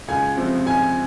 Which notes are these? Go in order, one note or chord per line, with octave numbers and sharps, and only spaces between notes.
C#2 G#5
C3 F3 C4
C#2 G#5